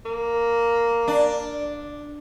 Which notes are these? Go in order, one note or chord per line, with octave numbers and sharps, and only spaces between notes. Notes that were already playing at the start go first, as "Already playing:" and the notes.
A#3
D4